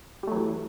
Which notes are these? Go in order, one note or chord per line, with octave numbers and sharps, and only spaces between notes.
E3 F#3 G3 A3